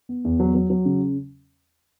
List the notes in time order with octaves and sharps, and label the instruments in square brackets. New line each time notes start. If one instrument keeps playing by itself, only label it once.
[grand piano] B3
E2
F#3
F#3
F#3
C#3